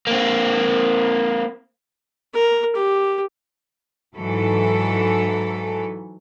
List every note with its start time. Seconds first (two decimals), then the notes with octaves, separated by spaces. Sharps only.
0.07 A#3 C4
2.34 A#4
2.75 G4
4.15 G#2 E3 F#3 A4